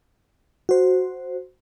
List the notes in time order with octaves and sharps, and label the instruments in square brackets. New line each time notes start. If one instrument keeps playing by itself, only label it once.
[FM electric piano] F#4 C5